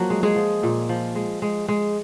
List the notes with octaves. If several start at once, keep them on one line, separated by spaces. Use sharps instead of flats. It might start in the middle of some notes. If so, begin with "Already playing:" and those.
Already playing: F3 F#3 A#3 F#4
G#3
G#3 G#4
F3
A#2
F3
G#3
G#3
G#3